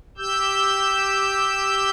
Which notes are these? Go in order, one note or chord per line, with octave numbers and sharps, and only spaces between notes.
G4 E6 G6